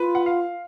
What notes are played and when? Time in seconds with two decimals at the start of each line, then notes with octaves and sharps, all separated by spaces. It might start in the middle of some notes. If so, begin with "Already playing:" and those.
Already playing: F4 B4
0.15 F#5
0.26 F5